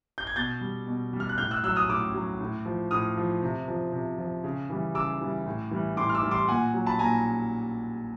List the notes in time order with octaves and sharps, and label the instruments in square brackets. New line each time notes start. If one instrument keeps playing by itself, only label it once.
[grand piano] G6
G#6
B2 G6 A6
G3
B2
G3
F6
F#6
A2 F6 G6
E6 F#6
F#3 E6 F#6
D#6 F6
A2 D6 E6
F#3
A2
F3
A2 D#6 F6
F3
C3
F3
C3
F3
C#3
E3 G3
C#3 D6 E6
E3 G3
A2
E3 G3
A2 C6 D6
F6
D6 E6
E3 G3
C6 D6
A#2 F#5 G#5
F#3
A5 B5
A#2 G#5 A#5